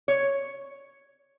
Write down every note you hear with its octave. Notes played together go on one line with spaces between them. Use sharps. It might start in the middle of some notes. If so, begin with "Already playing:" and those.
C#5